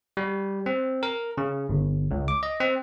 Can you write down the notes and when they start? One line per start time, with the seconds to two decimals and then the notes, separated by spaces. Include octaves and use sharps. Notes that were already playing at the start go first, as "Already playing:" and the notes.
0.17 G3
0.66 C4
1.03 A#4
1.38 C#3
1.69 G1
2.11 C#2
2.28 D6
2.43 D#5
2.60 C4